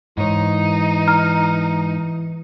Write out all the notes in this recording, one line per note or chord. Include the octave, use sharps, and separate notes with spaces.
G#2 E3 D#4 C#5
A#5 F6